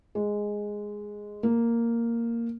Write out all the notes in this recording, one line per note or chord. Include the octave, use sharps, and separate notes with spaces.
G#3
A#3